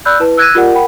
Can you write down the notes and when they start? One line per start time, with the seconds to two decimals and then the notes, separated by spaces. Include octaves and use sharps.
0.05 D5 B5 E6 F#6 G6
0.20 E4 B4 A5
0.37 E6 F#6 G#6 A#6 B6 D#7
0.55 F4 G4 A#4 D5 F#5
0.73 A#4 F#5 G5 B5